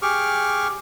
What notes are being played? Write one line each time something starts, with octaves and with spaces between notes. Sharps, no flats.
G4 G#4 C#6 D6 F6